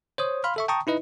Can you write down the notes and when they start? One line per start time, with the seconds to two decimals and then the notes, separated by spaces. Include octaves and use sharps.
0.18 C5 C#5 D#6
0.44 F5 B5 C6 F6
0.56 A4 E5 C#6
0.68 G5 A5 A#5 C#6 D#6
0.87 D#4 E4 B4 D#5